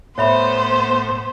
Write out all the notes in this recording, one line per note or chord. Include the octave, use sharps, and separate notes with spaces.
A2 B3 C5 C#5 E5 B5